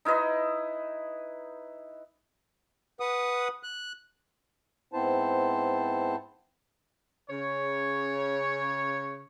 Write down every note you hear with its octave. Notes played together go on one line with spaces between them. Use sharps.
D#4 E4 B4 D#5
B4 F#5 D#6
F#6
G#2 B3 C4 E4 C5 A5
C#3 C#5